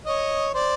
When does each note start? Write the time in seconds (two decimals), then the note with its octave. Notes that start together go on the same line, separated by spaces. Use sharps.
0.06 C#5 D#5
0.54 C5 D5